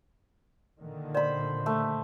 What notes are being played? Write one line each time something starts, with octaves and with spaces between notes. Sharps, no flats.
A#2 D3 D#3
C5 D5 B5
A3